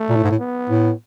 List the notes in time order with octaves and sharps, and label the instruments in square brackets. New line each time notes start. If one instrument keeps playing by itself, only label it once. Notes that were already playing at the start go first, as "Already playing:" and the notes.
Already playing: [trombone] A3
[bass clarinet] A#2
A2
G#2
A2
[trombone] B3
[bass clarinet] A2